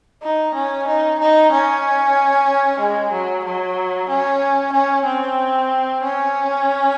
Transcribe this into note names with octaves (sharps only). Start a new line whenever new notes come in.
D#4
C#4
D#4
D#4
C#4
G#3
F#3
F#3
C#4
C#4
C4
C#4